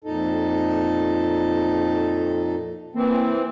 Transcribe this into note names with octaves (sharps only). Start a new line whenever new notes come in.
F2 A#2 D#4 A4
E3 A#3 C4